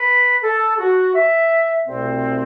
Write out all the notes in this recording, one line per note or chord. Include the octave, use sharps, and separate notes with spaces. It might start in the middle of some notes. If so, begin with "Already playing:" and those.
Already playing: B4
A4
F#4
E5
C2 B2 A3 C4